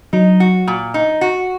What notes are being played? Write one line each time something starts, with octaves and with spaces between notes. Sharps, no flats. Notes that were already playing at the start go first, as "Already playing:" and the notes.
F#3 D#4
F#4
A#2
D#4
F#4